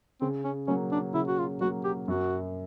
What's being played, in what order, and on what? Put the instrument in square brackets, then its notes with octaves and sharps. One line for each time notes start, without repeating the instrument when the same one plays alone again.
[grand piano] C#3 [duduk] C4
[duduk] C#4
[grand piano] F#3 A#3 [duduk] C#4
[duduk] D4
[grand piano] C#3 [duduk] E4
[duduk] F#4
F4
[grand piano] F#3 A#3 [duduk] F#4
[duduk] G4
[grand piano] F#2 [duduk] F#4